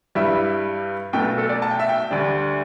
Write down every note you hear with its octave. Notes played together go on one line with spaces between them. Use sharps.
G2 G3 E4 E5
B1 B2 A3 G5
A4
D5
A5
G5
E5
G5
D2 D3 G3 D4